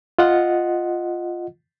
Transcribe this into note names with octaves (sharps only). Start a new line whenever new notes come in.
F4 D#5 F#5